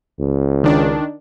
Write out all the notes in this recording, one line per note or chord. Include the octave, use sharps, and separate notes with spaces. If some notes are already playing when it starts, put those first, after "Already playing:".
C#2
D#3 D4